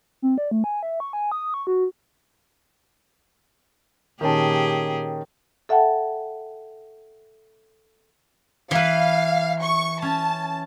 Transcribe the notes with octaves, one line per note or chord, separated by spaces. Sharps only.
C4
D5
A3
G#5
E5
C#6
G#5
D#6
C#6
F#4
A#2 D#3 C#4 G4 G#4 A5
A4 E5 F#5 G5 A5
E3 B4 F5
C#6
C#4 A5